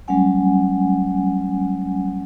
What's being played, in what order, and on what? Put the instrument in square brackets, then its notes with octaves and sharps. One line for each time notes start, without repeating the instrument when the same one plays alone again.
[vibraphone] F#3 G3 A3 C#4 F#5 G#5